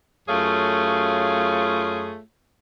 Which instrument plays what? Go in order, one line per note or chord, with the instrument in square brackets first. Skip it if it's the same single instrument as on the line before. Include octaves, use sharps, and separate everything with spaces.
[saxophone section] F#2 A3 F4 G#4 C#5 F5